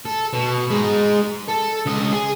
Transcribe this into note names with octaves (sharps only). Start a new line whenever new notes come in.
A4
B2
G#3 D#4
A4
C#2 D#5
G#4